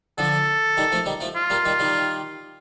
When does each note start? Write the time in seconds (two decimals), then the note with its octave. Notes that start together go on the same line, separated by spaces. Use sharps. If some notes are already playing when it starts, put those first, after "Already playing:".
0.18 D3 F3 A4
0.77 D#3 G3
0.92 F3 A3
1.06 D#3 G3
1.20 F3 A3
1.35 F4
1.50 G3 A#3
1.65 D#3 G3
1.79 D#3 G3